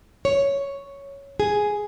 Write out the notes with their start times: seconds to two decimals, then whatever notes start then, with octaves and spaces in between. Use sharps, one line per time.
0.25 C#5
1.40 G#4